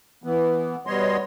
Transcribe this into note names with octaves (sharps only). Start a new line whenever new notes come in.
E3 B3
B2 G3 B3 C#5 D#5 C6